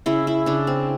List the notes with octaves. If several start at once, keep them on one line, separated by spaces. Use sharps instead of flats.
C#3 E4
E4
C#3 D4
C4